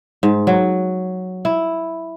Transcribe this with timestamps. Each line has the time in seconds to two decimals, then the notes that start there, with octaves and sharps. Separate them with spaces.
0.23 G#2
0.47 F#3
1.45 E4